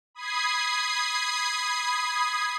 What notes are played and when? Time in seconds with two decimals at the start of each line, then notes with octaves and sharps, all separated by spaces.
0.15 B5 D#6 G#6 C7